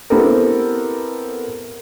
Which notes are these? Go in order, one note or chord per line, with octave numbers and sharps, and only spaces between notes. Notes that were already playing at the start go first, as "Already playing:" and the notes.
B3 C4 E4 G4 A4 A#4